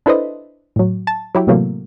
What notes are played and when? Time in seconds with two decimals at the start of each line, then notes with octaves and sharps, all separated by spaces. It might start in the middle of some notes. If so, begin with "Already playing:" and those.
0.06 D4 E4 A4 B4 C5 D#5
0.76 A2 F#3
1.07 A5
1.35 F#3 E4 G4
1.47 A2 C3 E3 F#3 A3 A#3